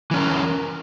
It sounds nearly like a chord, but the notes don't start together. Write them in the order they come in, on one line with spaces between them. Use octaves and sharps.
E3 C#4 A#4